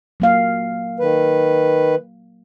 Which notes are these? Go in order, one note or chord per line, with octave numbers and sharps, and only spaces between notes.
F#3 A#3 F5
D#3 B4